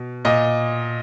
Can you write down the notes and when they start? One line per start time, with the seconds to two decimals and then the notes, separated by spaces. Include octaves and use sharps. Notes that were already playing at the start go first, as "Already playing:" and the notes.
Already playing: B2
0.25 A#2 D#5